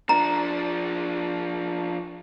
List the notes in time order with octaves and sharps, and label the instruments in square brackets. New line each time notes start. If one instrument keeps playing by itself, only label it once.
[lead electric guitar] F3 D4 [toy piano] A#5